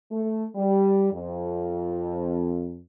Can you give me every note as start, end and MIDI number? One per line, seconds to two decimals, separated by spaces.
0.11 0.46 57
0.55 1.08 55
1.13 2.80 41